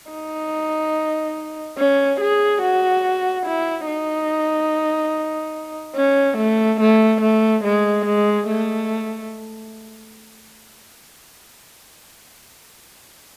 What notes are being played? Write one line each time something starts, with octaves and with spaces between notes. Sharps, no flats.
D#4
C#4
G#4
F#4
E4
D#4
C#4
A3
A3
A3
G#3
G#3
A3